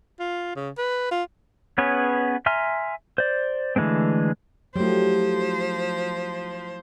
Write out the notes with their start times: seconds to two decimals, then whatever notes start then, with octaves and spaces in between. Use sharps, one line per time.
0.20 F4
0.56 C#3
0.78 B4
1.11 F4
1.78 B3 C#4 G#4 B4 C#5
2.46 E5 G#5 A#5 C6 F6
3.18 C5 D5
3.76 D3 E3 G#3 A3 C4
4.76 F3 F#3 A3 E4 G4 C5